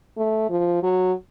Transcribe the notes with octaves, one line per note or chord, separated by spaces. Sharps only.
A3
F3
F#3